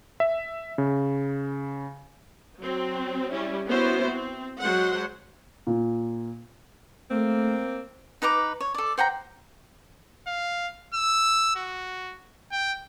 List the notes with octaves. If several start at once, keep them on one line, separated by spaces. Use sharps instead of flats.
E5
C#3
F#3 C4
G3 C#4 E4
B3 C#4 E4 F#4 C5
C4
F#3 G#3 C5 F#5
A#2
A3 A#3 C4
D#4 B4 A#5 D6
C#5
A4 D5
C5 F#5 G5 A#5
F5
E6
F#4
G5